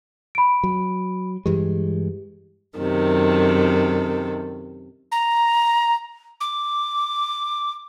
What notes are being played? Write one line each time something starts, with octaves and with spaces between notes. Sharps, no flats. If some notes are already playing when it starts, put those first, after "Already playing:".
B5 D7
F#3
G2 E3 G#3 G4
F#2 C3 D#3 A4
A#5
D6